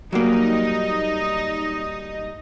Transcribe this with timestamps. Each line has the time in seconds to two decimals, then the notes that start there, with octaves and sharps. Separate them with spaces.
0.13 F#3 G3 A#3 D#4 D#5